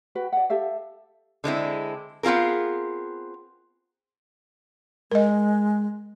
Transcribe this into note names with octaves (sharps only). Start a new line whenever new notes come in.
F#4 B4 G5
D5 F#5
G4 A4 E5 F5
D3 G#3 C4 E4
B3 C4 F4 G#4 A#4
G#3 A#4 D#5